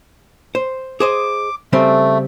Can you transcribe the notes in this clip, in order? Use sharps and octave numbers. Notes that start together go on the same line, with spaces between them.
C5
G#4 C5 D#5 D6
C#3 G3 A3 C4